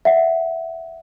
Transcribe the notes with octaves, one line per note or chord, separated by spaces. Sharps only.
E5 F#5